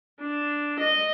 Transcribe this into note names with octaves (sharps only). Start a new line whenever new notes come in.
D4
D#5